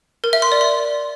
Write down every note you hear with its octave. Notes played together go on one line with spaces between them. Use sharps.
A#4
E5
C6
D5
C6